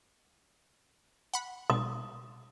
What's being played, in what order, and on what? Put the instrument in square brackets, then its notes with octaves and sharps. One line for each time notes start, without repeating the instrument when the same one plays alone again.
[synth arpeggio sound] F#5 B5
[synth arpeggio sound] B1 [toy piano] D#6